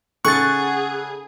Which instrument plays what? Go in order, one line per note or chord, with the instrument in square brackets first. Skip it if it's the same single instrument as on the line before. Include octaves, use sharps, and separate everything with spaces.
[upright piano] C#3 D#4 A4 [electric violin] G#4 [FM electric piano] F#5 [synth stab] C#6 A6